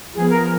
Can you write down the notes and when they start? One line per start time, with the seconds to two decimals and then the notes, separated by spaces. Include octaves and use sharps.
0.14 F3 B3 G#4
0.30 A#4